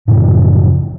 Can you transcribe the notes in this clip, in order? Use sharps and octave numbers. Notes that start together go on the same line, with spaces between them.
F#2 A2 C#3 F3